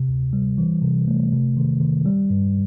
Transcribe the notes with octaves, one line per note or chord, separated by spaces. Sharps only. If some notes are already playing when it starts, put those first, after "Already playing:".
Already playing: C3
D2
G3
E3
C3
A3
C3
D#3
D#3
G3
G2